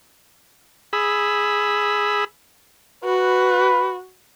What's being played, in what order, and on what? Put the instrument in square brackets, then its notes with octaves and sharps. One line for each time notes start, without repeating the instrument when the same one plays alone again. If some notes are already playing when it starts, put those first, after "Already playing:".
[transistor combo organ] G#4 B5 E6
[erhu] F#4 [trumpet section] B4